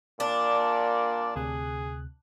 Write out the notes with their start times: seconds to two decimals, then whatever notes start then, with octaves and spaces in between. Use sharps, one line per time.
0.20 A#2 D4 D5
1.36 D2 C3 G#4 F#6